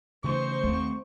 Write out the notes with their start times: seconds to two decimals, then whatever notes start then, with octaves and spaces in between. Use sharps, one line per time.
0.24 C#3 E3 A3 D#4 C5 C#6
0.63 D#2 A3 C4